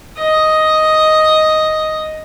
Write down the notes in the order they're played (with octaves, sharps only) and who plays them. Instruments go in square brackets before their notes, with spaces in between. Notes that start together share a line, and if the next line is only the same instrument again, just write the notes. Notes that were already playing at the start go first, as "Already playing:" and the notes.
[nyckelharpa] D#5